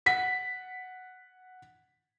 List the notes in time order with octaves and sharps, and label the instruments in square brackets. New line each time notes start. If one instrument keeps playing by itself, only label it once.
[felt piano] F#5 B6